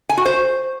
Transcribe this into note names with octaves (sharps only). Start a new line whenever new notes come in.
G#5
F#4
C5